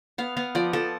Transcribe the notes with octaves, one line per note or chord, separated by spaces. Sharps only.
B3 F5
B3 F5
F3 D5
F3 A4